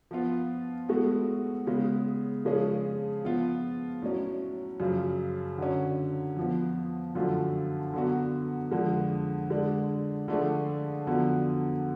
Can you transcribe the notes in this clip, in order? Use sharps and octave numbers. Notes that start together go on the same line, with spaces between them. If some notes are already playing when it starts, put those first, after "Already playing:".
F3 B3 F4
A2 G#3 B3 F#4 A4
C#3 G#3 B3
C#3 F3 G#3 C#4 G#4
F3 B3 F4
A2 F#3 C#4
F#2 C#3 F3
D3 F#3 C#4
F2 F3 B3
F#2 D3 F3 A3 F4
D3 F#3 B3 F#4
F2 D3 G#3
D3 G#3 D4
D3 F3 A3 D4 G#4
F2 D3 F#3 B3